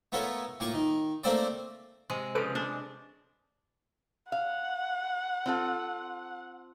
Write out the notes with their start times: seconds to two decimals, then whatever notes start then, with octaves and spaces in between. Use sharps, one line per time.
0.12 A3 B3 F4 A4 A#4 C#5
0.60 A2 A#3 F4 C#6 D6
0.74 D#3
1.24 A3 A#3 C4 A4 C5 D5
2.10 C3 G#3
2.35 C#3 F3 A4 B4 D7
2.55 D4
4.32 F5 F#5
5.46 C4 F4 A4